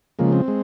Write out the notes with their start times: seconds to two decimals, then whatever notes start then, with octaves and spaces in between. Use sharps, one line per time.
0.19 C#3 F3 G#3 A#3
0.33 C4
0.48 G#3